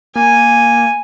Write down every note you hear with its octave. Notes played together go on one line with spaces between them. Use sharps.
A#3 G#5